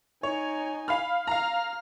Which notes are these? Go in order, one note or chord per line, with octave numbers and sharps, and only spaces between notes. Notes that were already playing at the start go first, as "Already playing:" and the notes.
D#4 C#5 G#5
F5 B5 F6
F5 A#5 F6